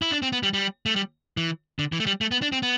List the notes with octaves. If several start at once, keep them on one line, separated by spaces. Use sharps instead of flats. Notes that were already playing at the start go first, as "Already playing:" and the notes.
E4
D4
C4
B3
G3
G3
A3
G3
E3
D3
E3
A3
G3
A3
B3
D4
C4
B3